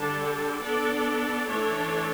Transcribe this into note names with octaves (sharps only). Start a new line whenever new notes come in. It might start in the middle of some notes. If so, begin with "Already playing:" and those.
Already playing: D3 G3 D4 A4
B3 D4 A4 D5
E3 A3 D4 A4 C#5